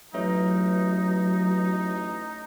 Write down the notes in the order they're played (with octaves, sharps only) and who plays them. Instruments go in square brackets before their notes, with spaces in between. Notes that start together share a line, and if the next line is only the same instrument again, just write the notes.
[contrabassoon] A1 [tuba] F#3 [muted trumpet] D#4 [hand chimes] B4 C#5 E5